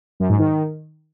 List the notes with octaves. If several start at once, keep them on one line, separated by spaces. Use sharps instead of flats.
F#2
G#2
D#3